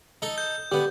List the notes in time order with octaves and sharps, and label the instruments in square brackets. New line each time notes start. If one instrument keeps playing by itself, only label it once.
[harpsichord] D#4 A4
[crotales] G6
[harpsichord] D3 B3 [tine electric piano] G4